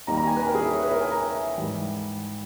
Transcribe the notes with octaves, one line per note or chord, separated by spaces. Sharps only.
D#2 D#3 G3 A#5
A#5
G#5
B4
A#4
G#4
E5
C#5
B4
A#4
G#5
A#5
E5
G#2 E3 G3